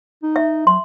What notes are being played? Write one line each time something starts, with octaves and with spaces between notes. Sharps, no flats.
D#4
E5
F#3 C6